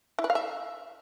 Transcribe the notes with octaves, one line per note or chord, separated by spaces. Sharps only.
E4
B4
F5
E5